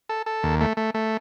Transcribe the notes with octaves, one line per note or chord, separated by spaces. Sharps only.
A4
A4
D#2
A3
A3
A3